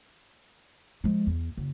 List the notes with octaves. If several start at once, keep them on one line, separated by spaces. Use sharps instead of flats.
F3 G#3
E2
F#1